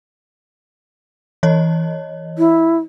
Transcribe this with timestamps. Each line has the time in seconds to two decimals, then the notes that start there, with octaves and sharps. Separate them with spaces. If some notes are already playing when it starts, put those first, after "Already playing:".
1.43 E3 C#5 D#5
2.38 E4